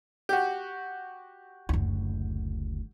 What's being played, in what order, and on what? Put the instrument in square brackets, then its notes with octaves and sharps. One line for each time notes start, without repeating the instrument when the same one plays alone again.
[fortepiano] F#4 G4
[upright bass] F#1 D2